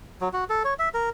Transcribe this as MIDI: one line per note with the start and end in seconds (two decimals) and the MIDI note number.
0.21 0.29 54
0.33 0.44 66
0.50 0.63 69
0.64 0.74 73
0.79 0.89 76
0.94 1.10 70